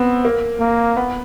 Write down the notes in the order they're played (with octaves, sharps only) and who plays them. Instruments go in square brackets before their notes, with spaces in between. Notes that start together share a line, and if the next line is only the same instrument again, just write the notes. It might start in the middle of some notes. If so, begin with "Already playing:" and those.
Already playing: [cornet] B3 [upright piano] C4
[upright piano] A#3
[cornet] A#3
[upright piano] B3